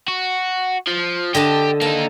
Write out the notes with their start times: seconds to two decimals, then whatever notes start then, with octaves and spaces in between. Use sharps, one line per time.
0.08 F#4
0.87 F3
1.35 D3 G4 D#5 A5
1.81 A#3 D#4 A5